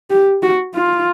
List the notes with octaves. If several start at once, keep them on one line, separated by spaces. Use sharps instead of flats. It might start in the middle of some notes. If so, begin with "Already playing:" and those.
G4
F#4
F4